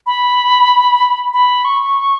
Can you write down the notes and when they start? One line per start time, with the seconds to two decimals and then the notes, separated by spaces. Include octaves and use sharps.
0.06 B5
1.33 B5
1.65 C#6